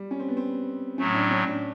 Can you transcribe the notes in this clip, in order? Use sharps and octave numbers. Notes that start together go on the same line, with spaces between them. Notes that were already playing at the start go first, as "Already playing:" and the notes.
Already playing: G3
C#4
C4
B3
C4
A2 F#3 A3 C#4
D4
C#4
D4